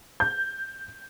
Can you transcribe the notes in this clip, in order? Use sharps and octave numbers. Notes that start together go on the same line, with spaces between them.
G6